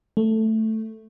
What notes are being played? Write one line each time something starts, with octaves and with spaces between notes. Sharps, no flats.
A3